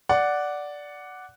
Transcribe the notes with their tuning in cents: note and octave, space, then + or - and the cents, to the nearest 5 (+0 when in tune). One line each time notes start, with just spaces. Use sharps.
D5 -5 F#5 +0